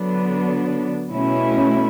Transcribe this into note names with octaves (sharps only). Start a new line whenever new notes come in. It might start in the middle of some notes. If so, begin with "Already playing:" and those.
Already playing: D3 F#3 B3 D4
B2 A3 C#4 E4